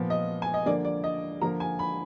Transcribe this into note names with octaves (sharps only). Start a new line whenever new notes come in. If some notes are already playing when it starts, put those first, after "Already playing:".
Already playing: A#2 F3 B3
D#5
G#5
D#5
D3 F3 A#3 D5
D5
D#5
D3 F3 A#3 A#5
G#5
B5